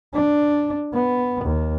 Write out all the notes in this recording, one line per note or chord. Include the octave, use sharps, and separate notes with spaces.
D4
B3
D#2